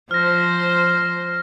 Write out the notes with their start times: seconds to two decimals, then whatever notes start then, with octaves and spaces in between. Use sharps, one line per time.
0.11 F3 C5 F6 A#6